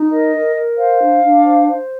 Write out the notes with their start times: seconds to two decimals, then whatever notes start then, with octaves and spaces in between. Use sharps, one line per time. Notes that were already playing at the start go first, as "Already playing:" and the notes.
Already playing: D#4
0.10 A#4 D#5
0.33 A#4
0.55 A#4
0.77 C5 F5
1.00 D4
1.23 D4
1.44 C5
1.68 C5